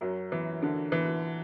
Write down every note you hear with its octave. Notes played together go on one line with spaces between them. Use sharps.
F#2 F#3
E3
D3
E3